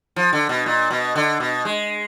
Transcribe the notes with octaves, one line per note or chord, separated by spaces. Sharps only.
F3
D3
B2
A#2
B2
D3
B2
G#3